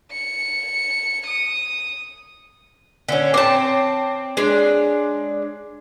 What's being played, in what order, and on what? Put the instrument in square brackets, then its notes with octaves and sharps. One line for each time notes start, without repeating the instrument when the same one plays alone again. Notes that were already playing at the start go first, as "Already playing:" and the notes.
[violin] C#7
D#6
[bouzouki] D3 C#4
[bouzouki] C4 A5 [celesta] C#5 D6
[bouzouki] G#3 D4